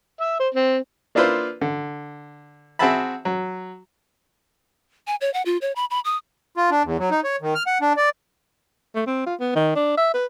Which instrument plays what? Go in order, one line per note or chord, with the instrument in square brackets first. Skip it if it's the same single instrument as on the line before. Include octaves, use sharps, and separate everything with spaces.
[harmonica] E5
C5
C4
[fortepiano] A#3 D4 E4 F4 B4 C5
D3
C4 F#4 G#4 E5 A5 B5
F#3
[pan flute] G#5
C#5
F#5
F4
C#5
B5
B5
D#6
[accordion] F4
D4
E2
F#3
D#4
C#5
D#3
F6
F#5
D4
D5
[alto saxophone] A3
C4
F4
B3
D#3
D4
E5
B4